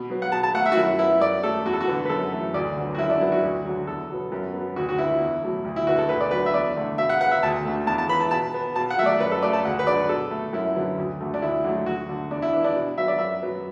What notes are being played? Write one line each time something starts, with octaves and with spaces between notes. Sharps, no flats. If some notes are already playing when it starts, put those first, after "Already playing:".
Already playing: B2
F#3 B3
F#5
B2 A5
A5
A3 F#5
E5
F#4
F#2 E4
F#3 B3 E4
F#2 D5
F#3 A3 A4
E2 F#4
A4
F#4
D3 B3
B4
F#2 A4
E3 A3
D2 D5
D3 F#3 B3
F#4
F#2 E4
D4
F#3 B3 E4
F#4
D2
D3 F#3
E2 A4
B2 F#3 B3
F#2
F#3 B3
D2 F#4
F#4
D3 B3 E4
E2
B2 F#3 A3
D2
E4
D3 B3 F#4
A4
D2 B4
D5
D3 F#3 B3 B4
E5
E2 D5
D3 A3
B2 E5
F#5
B3 F#5
E5
D2 A5
D3 A3
E2 A5
A5
E3 B3 B5
A5
B2 A5
B3
B2 A5
F#5
F#3 A3 D5 E5
F#2 B4
A4
F#3 A3 D5
A5
D2 F#5
B4
D3 F#3 D5
B2 A4
A3
F#2 E4
D3 F#3 B3
D2
D3 A3
D4
D2 E4
D3 F#3 A3
D2 F#4
D3 A3
E2 D4
E4
E3 B3 D4
D4
B2
F#3 B3 E5
D5
F#2 E5
F#3 B3